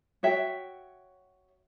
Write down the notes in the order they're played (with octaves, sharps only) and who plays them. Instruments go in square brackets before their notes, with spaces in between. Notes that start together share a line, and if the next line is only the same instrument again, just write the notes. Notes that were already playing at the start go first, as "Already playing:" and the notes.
[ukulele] F#4 C#5 E5 G5